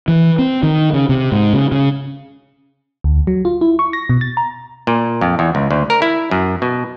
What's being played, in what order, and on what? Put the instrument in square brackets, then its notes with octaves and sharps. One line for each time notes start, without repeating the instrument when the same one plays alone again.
[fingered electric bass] E3
C4
D#3
C#3
C3
G#2
C#3
C#3
[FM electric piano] D2
F#3
F4
E4
C#6
A#6
B2
A6
A#5
[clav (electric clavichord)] A#2
F2
E2
C#2
D2
A#4
E4
F#2
B2